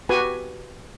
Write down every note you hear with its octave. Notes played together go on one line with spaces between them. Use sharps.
F#4 G4 B4 G#5